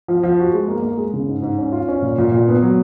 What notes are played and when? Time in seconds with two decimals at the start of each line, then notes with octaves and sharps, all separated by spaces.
0.08 F3
0.23 F3
0.39 F#4
0.53 G#3
0.68 A#3
0.82 A#3
0.98 G#3
1.14 C#3
1.28 G#2
1.42 G#2
1.58 C#4
1.72 F4
1.88 C#4
2.02 A#2
2.18 A#2
2.32 A#2
2.48 B3
2.63 F#3